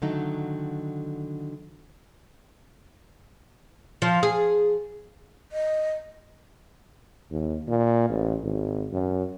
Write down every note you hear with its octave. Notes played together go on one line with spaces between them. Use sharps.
D3 D#3 F#3 A3 D#4
F3
G#4
D#5
D#2
A#2
A1
G#1
F#2